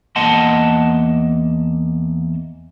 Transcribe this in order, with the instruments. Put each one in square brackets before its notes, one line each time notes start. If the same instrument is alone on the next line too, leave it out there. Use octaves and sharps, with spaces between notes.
[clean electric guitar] E2 A#3 D#5 F#5 A5 C6